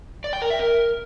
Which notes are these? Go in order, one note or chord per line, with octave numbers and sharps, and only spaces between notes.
D5
G5
A#4
E5
A#4